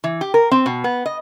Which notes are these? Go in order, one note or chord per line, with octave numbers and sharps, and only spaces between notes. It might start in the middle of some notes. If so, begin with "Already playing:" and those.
E3
G4
A#4
C4
B2
B3
D#5